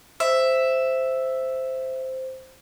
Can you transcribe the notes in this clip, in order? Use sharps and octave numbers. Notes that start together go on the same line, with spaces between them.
C5 E5